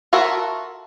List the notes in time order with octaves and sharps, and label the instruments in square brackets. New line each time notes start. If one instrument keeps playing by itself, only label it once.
[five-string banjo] F4 F#4 A4 A#4 E5